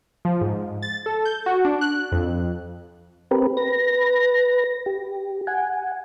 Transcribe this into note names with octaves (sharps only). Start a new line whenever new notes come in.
F3
G#2
A6
A4
G6
F#4
D4
F#6
F2
C4 G4 A#4 B4
B4 A#6
G4
F#5 G#5